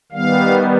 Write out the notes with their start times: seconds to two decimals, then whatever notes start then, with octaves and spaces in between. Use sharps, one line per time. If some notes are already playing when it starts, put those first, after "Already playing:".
0.12 D#3 G3 B3 F5